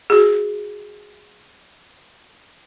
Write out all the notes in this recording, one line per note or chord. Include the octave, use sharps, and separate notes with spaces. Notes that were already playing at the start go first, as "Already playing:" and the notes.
F#4 G#4